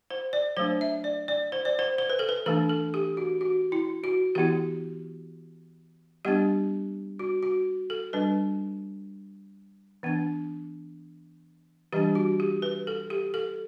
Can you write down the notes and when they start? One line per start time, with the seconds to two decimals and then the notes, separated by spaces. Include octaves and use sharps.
0.10 C5
0.33 D5
0.57 F#3 A3 D4 C5
0.81 E5
1.04 D5
1.28 D5
1.52 C5
1.65 D5
1.79 C5
1.98 C5
2.10 B4
2.19 A4
2.29 B4
2.46 E3 A3 D4 A4
2.69 A4
2.94 G4
3.17 F#4
3.41 F#4
3.72 E4
4.04 F#4
4.35 E3 B3 E4 G4
6.25 G3 B3 D4 G4
7.19 F#4
7.43 F#4
7.90 A4
8.13 G3 D4 B4
10.03 E3 B3 D4
11.93 E3 G3 D4 G4
12.15 F#4
12.40 G4
12.62 B4
12.87 A4
13.10 G4
13.34 A4